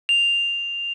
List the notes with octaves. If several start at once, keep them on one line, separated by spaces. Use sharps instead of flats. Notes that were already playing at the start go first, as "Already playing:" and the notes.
F7